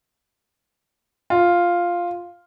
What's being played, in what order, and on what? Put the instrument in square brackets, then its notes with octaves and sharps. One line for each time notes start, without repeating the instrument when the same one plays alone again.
[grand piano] F4